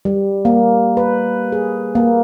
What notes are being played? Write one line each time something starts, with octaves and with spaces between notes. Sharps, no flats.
G3
A#3
B4
G#4
A#3